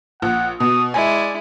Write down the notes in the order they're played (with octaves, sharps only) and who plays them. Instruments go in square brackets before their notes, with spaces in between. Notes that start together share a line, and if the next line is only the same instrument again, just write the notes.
[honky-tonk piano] A#1 [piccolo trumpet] F#5
[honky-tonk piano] B2 [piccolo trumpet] D#6
[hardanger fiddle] G#3 E4 [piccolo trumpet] D5 [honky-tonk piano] G#5